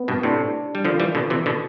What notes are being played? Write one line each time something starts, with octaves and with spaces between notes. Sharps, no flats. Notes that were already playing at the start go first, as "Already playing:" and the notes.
Already playing: B3
G2 B2
A2 C3 D4
G3
D3 F3 F4
E3 G3
B2 D3
C3 E3
B2 D3